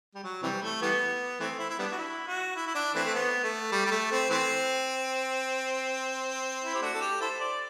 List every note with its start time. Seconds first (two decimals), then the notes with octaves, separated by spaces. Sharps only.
0.15 G3
0.24 F#3
0.43 C3 E3 G3
0.63 A3
0.82 E3 G3 B3
1.40 E3 A3 C4
1.59 E4
1.70 E4
1.79 G3 B3 D4
1.92 F#4
1.98 E4
2.27 F#4
2.56 E4
2.67 E4
2.75 D4
2.95 E3 A3 C4
3.05 A3
3.14 B3
3.43 A3
3.72 G3
3.86 G3
3.91 A3
4.11 C4
4.30 E3 A3 C4
6.62 E4
6.75 G4
6.82 A3 D4 F#4
6.94 A4
7.01 G4
7.21 E4 A4 C5
7.40 D5